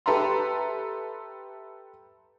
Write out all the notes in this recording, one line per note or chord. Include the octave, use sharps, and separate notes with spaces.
G4 A4 B4 E5 A#5 C6